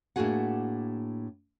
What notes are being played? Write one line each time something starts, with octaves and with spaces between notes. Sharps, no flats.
A2 A#3 D4 F#4 G#4 F#5